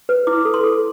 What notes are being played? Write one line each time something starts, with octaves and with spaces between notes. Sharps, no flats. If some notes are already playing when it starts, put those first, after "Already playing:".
B4
E4 D6
A4
C6
A4